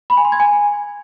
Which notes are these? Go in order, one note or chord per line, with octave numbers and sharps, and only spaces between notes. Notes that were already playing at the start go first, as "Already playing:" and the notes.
B5
G#5
C6
G#6
G#5